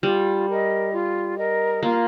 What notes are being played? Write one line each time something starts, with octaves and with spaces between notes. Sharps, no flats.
G3 F4
A#4 D#5
F4
A#4 D#5
A#3 F4